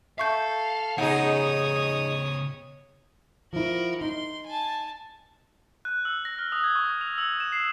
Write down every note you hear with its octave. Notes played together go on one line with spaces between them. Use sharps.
A4 E5 F5 C#6 G6
C#3 B3 D#4 G#4 C#5 F#5 D#6
F3 E4 F#4 A#4
D#4 C6
G#5 A5
F#6
E6
A#6
F6
D#6
G#6
C#6
F7
E6
E7
C7